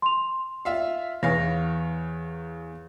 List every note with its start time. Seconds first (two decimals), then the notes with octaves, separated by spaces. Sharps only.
0.02 C6 F7
0.65 F4 E5 F5
1.23 E2 E3 C#5 F5 A#6